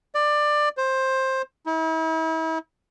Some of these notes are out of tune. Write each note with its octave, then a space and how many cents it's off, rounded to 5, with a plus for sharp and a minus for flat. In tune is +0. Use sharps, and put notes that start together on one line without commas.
D5 +20
C5 +15
E4 -40